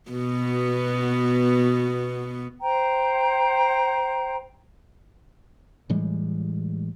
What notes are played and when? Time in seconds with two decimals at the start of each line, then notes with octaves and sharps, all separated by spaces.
0.11 B2 B3 F#4
2.61 C5 G5 A#5
5.90 A2 E3 G3 G#3